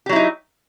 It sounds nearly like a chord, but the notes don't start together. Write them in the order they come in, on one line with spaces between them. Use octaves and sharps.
G4 F#3 E4 D#4